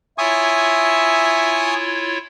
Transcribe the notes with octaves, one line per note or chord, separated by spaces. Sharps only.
E4 F4 C#5 E5 G#5 C#6 D#6